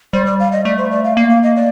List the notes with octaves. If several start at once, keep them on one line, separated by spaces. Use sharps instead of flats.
G3 C5
D5
F5
D#5
A3 D5
C5
D5
F5
A#3 F5
F5
D#5
D5